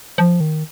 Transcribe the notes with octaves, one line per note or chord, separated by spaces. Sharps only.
F3
D#3